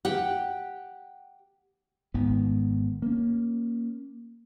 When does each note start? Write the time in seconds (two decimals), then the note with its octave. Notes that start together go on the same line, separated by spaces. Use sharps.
0.05 G4 F#5 G5
2.14 G#1 G#2 D#3 B3
3.02 A#3 C#4